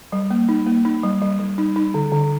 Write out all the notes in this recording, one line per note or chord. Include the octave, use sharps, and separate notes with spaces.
G3
A#3
D#4
A#3
D#4
G3
G3
G3
D#4
D#4
D3
D3